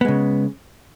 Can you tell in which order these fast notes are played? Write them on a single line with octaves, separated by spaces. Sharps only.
B3 G#3 C#3